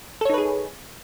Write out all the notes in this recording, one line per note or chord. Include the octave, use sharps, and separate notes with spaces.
D#4 G#4 A4 B4 C#5